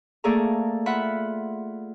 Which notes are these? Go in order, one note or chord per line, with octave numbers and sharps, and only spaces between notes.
A3 A#3 G#4 A4 D5 A#5
F4 E5 F#5 B5